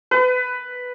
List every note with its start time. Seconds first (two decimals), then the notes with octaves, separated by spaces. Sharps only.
0.11 B4